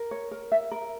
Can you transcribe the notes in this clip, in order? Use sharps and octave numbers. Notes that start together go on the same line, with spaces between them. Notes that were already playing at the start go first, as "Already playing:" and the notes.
Already playing: A#4
C#5
A#4
E5
A#4